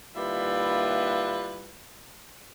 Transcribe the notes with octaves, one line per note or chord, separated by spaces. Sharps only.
D#2 G3 E4 F4 B4 E5